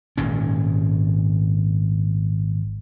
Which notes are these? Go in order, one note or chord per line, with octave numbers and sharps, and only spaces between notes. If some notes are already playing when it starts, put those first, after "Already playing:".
G#1 A#2 C#4